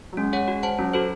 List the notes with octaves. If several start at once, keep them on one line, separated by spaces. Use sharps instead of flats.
F#3
G#3 C#4
G#4 C#5 F#5
F#4
C5 F#5 A5
F#3 C#4
F#4 A4 C5